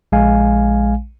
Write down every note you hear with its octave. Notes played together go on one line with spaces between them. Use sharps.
A#1 G#3 F5 G#5